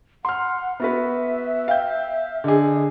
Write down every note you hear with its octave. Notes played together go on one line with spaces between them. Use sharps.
F#5 C6 F6
B3 F#4 B4 E5
F5 G5 G6
D3 G#4 D#5